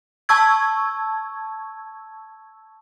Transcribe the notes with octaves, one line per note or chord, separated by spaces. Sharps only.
A5 C#6 E6 G#6